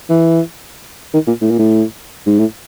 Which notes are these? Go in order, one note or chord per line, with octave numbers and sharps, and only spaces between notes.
E3
D#3
A#2
A2
A#2
A2
G#2
A2